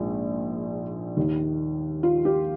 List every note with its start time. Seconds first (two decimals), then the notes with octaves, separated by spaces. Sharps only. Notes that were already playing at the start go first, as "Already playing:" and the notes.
Already playing: A#1 G#2 F3
1.17 D#2 D#3
2.03 F4
2.25 G4